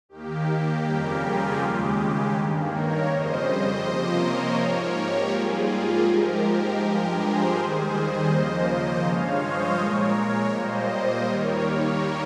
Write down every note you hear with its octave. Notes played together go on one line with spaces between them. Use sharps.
D#2 D#3 A#3 G4
F2 C#3 G3 A#3 G4 A#4
F4 G#4
D#2 C#3 G#3 G4
G2 D#3 A#3
A#4 C#5
F2 C#3 G3 C5 D#5
C3 F3 A#3
A#4 C#5
G#2 F3 A#3
G4
G#2 G3 A#3 F4 G#4
F4 G#4
G#2 F3 G#3 G4 A#4
G4 A#4
G2 F3 G#3
G#4 C5
D#2 D#3 G3
C5 D#5
D#2 C#3 F3 A#3
G2 F3 G#3 C#5 F5
C5 D#5
A#2 G#3 A#4 C#5
A#4 C#5
A#2 G3 A#3 C5 D#5
C5 D#5
D#2 D#3 G3 A#3 A#4 C#5
A#4 C#5